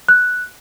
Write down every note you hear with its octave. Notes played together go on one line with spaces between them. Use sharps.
F#6